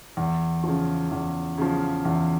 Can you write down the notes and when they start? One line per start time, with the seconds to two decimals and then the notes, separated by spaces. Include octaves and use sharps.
0.17 E2
0.63 C#3 F3
1.11 E2
1.58 C#3 F3
2.05 E2